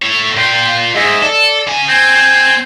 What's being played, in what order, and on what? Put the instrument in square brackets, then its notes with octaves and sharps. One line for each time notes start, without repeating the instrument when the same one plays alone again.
[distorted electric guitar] A3 C#5
[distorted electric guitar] A#2 F4 [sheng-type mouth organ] G5
[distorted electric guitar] G#2 [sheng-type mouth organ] G#4 D#5 E5
[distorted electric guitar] A4 [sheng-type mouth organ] D5
[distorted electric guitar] C#3 G#5
[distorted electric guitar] C4 [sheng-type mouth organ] G#5 G6